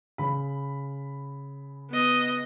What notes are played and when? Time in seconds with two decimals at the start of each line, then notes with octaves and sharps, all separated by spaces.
0.18 C#3 B5
1.90 B3 D#5